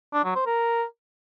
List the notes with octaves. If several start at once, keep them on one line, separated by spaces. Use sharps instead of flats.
D4
F#3
C5
A#4